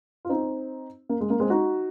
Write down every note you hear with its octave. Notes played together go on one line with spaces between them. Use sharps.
F4
C4 D#4
A#3
G#3
A#3
G#3 C4
D#4 F#4